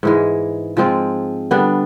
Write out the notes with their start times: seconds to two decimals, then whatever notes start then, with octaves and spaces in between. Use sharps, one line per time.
0.03 G#2 E3 G#3
0.77 F3 G#3 C4 F4
1.51 D3 G3 B3 D4